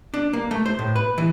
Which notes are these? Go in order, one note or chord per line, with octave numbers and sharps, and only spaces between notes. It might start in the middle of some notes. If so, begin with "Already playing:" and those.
D4
A#3
A3
C5
A2
B4
E3